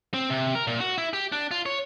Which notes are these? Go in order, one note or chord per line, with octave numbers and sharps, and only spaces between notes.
C4
C3
A#4
A#2
F#4
E4
G4
D4
F4
C#5